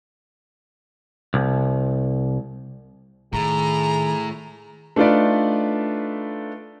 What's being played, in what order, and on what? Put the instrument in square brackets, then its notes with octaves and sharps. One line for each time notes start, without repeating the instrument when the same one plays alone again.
[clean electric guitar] C2
[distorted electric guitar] A2 [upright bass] D#3 [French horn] G#4 [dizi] A#5
[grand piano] A3 D4 D#4 F4 B4 D5